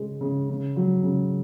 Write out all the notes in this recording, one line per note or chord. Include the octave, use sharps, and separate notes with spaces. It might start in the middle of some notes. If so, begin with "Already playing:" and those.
Already playing: C#3 G#3
C#3
C#3
F#3
C#3